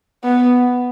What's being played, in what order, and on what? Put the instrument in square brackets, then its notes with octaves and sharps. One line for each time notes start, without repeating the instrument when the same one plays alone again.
[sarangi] B3